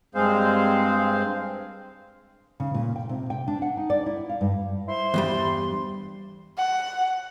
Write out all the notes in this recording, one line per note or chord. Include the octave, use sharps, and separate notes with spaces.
G2 G#3 C4 G#4 C5 F5
C#3
A#2
G5
C3
G5
D4
F#5
D#4
D5
E4
F5
G2
E4 C5 C6
E2 G2 G3
F#5